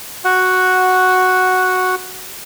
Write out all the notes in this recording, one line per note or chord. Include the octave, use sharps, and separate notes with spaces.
F#4 F#5